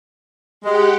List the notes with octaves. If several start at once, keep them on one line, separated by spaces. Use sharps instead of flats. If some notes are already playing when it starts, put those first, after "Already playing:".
G#3 G4 F#5